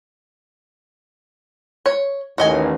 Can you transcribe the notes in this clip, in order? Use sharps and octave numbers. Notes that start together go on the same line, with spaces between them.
C#5
A1 D#2 F#4 D#5 G#5